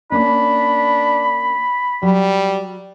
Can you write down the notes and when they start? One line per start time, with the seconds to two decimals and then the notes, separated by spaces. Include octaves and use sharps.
0.12 A#3 C#4 D4 B5
2.03 F#3 G3